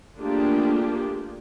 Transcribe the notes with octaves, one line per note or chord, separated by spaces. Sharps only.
A3 A#3 D4 F4 G4 G#4